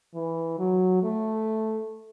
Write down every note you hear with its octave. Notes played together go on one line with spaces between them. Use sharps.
E3
F#3
A3